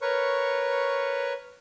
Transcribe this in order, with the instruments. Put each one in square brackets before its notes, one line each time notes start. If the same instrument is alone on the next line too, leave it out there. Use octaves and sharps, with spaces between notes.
[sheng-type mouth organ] A#4 B4 C#5 C#6